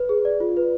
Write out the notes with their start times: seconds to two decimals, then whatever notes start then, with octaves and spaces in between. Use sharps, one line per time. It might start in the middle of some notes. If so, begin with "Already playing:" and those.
Already playing: B4
0.09 G#4
0.25 D5
0.40 F4
0.57 B4